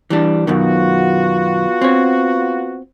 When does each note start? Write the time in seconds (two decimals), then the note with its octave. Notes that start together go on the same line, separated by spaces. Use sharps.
0.10 E3 G3 D4
0.47 F#2 B2 D#3 B3 F4 F#4
1.81 C4 C#5